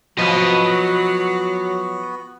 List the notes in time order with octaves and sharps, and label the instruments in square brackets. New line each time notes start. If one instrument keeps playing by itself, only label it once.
[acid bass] F3 [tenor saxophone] F#3 [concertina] B3 F#4 [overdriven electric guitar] B4 D#5